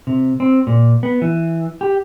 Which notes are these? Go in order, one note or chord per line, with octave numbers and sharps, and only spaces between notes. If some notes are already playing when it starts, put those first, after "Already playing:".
C3
C4
A#2
B3
E3
G4